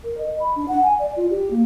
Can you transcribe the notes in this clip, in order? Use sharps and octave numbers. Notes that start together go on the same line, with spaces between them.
A#4
D#5
B5
D4
F#5
G#5
D5
F4
G4
A#3